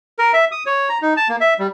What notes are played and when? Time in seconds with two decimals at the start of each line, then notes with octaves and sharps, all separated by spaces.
0.19 A#4
0.33 E5
0.52 D#6
0.66 C#5
0.89 A#5
1.02 D#4
1.17 A5
1.29 A#3
1.41 E5
1.59 G3